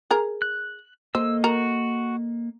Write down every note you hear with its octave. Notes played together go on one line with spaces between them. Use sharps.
G#4 A#4
F#6
A#3 A4 C5 D#5 E6
F#4 A#4